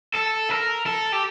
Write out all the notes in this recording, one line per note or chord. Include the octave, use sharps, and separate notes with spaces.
A4
A#4
A4
G4